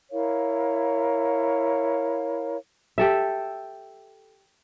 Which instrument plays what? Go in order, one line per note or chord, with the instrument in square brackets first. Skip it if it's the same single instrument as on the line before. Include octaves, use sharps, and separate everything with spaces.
[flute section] E4 A#4 C#5 F5
[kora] G4 A4 E5